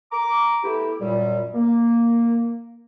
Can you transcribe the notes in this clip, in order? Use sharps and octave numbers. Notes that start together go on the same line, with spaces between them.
A#5 D6
A3 B3 E4 G4
F#2 A#2 G3
A#3